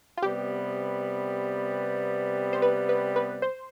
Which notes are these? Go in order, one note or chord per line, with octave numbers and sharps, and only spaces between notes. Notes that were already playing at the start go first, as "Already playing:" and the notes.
F4
C3 G3 B3 G4
C5
B4
B4
B4
C5